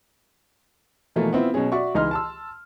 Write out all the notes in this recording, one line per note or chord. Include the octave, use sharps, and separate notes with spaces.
B2 E3 F3 A3 A#3 F4
B3 C4 E4 F4
B2 F#3 C#4 G#4
F#4 D5 E5 C#6
C#2 E3 D#4 C6 F6
A5 C6 E6